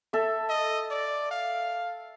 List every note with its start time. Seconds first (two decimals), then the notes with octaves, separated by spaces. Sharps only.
0.13 A4 E5
0.49 D#5
0.91 D5
1.31 F5